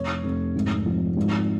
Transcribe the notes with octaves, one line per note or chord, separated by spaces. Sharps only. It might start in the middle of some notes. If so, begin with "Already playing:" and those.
Already playing: F1 C#5
F1
G#1
F3
G#1